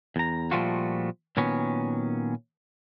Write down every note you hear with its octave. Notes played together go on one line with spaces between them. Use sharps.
E2 A#5
A#2 F3 G3 A3 F4 F#4
A#2 D#3 F#3 B3 C#4